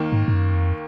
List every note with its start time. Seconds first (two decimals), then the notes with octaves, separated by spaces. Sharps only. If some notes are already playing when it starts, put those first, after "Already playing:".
Already playing: D#2 D#3 A#3
0.12 G#2
0.28 G#2
0.33 F#2
0.54 F2